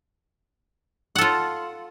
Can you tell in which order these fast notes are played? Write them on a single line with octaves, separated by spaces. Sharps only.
F#5 A4 F4